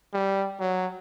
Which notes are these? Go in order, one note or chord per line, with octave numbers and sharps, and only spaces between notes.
G3
F#3